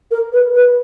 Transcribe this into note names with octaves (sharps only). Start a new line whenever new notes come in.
A#4
B4
B4